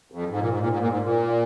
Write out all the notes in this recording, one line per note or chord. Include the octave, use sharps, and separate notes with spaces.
F2
G#2
A#2
G#2
A#2
G#2
A#2
G#2
A#2